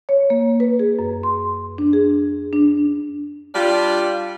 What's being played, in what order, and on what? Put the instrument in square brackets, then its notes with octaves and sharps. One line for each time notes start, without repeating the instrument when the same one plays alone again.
[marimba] C#5
A#3
B4
G#4
F#2
C6
D4
G#4
D4
[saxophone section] G3 D4 F4